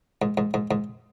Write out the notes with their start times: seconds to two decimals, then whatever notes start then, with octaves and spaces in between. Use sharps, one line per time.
0.22 G#2
0.38 G#2
0.54 G#2
0.71 G#2